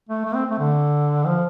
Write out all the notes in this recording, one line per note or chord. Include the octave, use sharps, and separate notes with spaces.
A3
A3
C4
A3
D3
F3